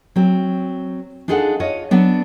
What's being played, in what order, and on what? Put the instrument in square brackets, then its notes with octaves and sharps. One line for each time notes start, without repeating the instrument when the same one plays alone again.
[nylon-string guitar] F#3 C4
D4 D#4 F4 G#4 A4 F#5
F4 C#5 D#5
F#3 B3 D4